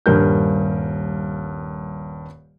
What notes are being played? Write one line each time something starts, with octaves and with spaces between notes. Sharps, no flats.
D#1 G2 A#4 G6